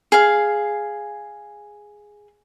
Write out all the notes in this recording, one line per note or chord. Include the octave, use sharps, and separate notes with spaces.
G#4 F5